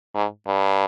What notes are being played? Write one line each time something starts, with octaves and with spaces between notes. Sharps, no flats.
G#2
G2